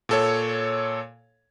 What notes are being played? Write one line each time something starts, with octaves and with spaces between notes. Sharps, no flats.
A#2 A4 C#5